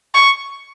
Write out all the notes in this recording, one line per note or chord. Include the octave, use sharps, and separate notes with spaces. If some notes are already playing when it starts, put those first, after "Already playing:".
C#6